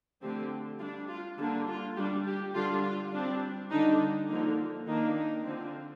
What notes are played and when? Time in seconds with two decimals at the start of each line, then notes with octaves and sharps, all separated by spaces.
0.22 D3 F3 A3 C4 G4
0.80 G3 F4
0.84 D4
1.09 F4
1.38 D3 G3 A#3 D4 A4
1.67 F4
1.97 G3 D4 G4
2.26 G4
2.54 D3 G3 D4 F4
2.83 F4
3.12 G3 C4 D4
3.71 D3 G3 D4 D#4
4.29 D3 F3 A#3 D#4
4.87 D#3 A#3 D4 D#4
5.17 D#4
5.45 D3 F3 C4